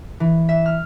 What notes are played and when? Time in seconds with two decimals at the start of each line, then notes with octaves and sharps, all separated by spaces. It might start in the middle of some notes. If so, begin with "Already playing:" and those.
0.20 E3
0.49 E5
0.66 F6